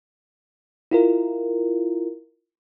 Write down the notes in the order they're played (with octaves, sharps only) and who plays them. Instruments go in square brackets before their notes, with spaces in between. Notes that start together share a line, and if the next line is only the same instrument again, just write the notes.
[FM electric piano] E4 F4 A#4